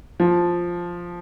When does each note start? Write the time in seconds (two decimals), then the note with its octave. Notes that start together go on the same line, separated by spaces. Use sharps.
0.20 F3